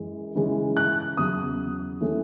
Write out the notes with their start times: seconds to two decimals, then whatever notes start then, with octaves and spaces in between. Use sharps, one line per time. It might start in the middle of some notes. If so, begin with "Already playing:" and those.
Already playing: F#2 E3 G#3
0.35 C#3 E3 G#3 C#4
0.77 F#6
1.17 E2 C#3 F#3 D#6
2.01 E3 A3 C#4